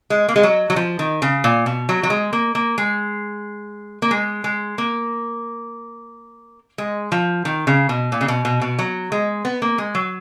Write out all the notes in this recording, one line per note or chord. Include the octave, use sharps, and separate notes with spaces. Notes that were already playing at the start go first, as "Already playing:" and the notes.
G#3
A#3
G#3
F#3
F#3
F3
D#3
C#3
A#2
B2
F#3
F#3
G#3
A#3
A#3
G#3
A#3
G#3
G#3
A#3
G#3
F3
D#3
C#3
B2
A#2
C#3
B2
B2
B2
F#3
G#3
B3
A#3
G#3
F#3